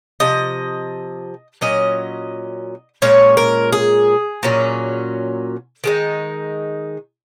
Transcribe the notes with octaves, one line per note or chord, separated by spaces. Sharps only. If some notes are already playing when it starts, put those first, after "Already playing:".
C3 F3 D#5
A#2 F#3 C#4 D#5
A#2 G#3 C#4 C#5
A#4
G#4
A#2 F#3 C#4
D#3 G#3 D#4